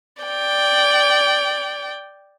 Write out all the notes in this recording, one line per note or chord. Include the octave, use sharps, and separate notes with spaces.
D5 G5